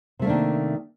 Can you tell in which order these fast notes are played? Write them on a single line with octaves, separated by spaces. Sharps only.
C3 A3 A#3 D4 D#3